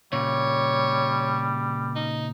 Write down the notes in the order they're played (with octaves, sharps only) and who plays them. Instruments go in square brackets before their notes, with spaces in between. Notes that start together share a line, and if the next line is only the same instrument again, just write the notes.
[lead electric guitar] A#2 C#3 [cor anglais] G3 [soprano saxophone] C#5
[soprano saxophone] D#4